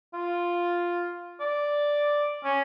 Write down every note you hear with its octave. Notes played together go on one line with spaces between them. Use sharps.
F4
D5
C#4